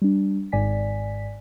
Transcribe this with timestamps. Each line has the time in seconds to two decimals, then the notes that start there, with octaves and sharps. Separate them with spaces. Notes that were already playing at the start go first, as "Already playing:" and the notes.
0.02 G3 D4
0.52 G#1 G#2 D5 G#5 B6